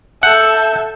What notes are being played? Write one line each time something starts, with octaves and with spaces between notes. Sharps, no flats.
A4 E5 F#5 G6